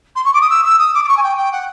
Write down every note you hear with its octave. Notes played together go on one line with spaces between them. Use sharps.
C6
C#6
D6
D#6
E6
E6
D#6
D6
D6
C#6
G#5
G5
G5
F#5